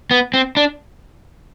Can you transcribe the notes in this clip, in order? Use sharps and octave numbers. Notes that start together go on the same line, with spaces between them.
B3
C4
D4